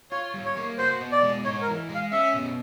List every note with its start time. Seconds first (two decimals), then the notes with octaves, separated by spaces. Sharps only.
0.11 F4 C#5
0.34 G3
0.45 C#5
0.57 A#3
0.78 F#4 C5
1.00 B2
1.12 D5
1.23 G#3
1.45 D#4 C#5
1.62 A#4
1.67 E3
1.89 G#3
1.95 F5
2.12 C#4 E5
2.34 B2